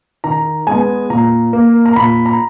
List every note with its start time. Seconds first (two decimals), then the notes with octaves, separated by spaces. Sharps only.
0.24 D#3 A#5
0.67 G#3 B3 G#5
1.10 A#2 A#5
1.53 A#3
1.86 A#5
1.96 A#2 B5
2.26 A#5